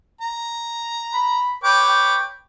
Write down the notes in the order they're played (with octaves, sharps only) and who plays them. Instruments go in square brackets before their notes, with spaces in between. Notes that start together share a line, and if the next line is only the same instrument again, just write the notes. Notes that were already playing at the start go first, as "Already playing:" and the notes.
[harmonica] A#5
[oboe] B5
[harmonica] B4 C#5 D6 [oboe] G5
[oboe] G5